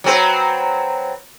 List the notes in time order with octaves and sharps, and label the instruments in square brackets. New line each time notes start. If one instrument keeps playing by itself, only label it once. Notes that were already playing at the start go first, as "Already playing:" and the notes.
[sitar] F#3 C4 B4